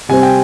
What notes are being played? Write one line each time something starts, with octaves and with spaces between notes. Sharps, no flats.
C3 G3 C4 G#5
G5